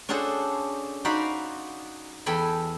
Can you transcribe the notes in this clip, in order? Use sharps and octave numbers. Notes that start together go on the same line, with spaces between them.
C#4 D4 F#4 G#4 A4 C5
D#4 F#4 C5 D5 F5 B5
E2 A4 G5 G#5 B5